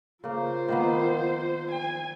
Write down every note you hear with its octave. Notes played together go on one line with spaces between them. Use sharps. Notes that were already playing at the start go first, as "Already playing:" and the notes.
C#3 A#3 F4 C5
D#3 A#3 B3
G#5